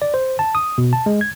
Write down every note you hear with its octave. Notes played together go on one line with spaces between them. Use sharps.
D5
C5
A5
D#6
B2
A5
G#3
G#6